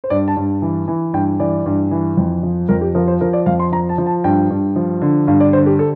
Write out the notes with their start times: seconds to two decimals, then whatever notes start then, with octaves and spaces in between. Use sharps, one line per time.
0.04 C5
0.10 G2 D5
0.28 A5
0.36 G2
0.62 E3
0.88 E3
1.14 G2 G5
1.40 E3 D5
1.66 G2
1.91 E3
2.17 F2
2.43 F3
2.69 F2 A#4
2.81 G4
2.95 F3 A#4
3.08 C5
3.21 F3 A#4
3.33 D5
3.46 F2 F5
3.60 C6
3.72 F3 A#5
3.89 A5
3.98 F3
4.06 A5
4.24 G2 G5
4.50 G2
4.76 F3
5.02 D3
5.27 G2 F5
5.40 D5
5.53 D3 C5
5.66 G4
5.79 A4